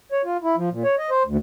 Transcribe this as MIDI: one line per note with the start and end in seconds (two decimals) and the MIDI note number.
0.12 0.22 73
0.25 0.37 65
0.43 0.56 64
0.57 0.69 53
0.71 0.83 46
0.84 0.95 73
0.98 1.10 75
1.10 1.23 72
1.26 1.37 38